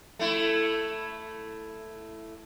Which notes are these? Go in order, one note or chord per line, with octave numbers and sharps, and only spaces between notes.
A3 E4